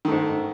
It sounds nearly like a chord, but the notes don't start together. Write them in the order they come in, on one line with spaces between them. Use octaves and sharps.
D#3 A3 G#2